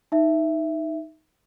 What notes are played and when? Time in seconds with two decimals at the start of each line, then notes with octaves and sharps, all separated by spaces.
0.12 D#4 E5